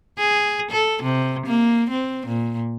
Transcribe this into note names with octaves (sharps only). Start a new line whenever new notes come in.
G#4
A4
C3
A#3
C4
A#2